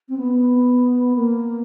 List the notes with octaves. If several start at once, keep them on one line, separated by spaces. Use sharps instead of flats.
C4
B3
A#3